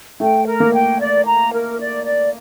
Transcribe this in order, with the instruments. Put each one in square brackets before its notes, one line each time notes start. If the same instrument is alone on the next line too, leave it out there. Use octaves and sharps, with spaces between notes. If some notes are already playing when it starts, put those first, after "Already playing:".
[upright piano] A3 [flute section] G5
[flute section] A#4
[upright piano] A#3
[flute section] G5
D5
A#5
A#4
D5
D5